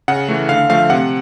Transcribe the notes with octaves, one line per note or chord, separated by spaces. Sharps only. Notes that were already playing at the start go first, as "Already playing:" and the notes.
C#3 F#5
E3 A3
D3 F5
F3 A3 F5
C3 F#5